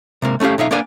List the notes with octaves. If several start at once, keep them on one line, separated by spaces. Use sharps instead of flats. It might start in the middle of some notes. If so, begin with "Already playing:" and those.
C3 G#3 A#3
A3 C#4 E4 G4 F5
B1 D#4 E5 F5
A#3 B3 D4 D5 F5 G#5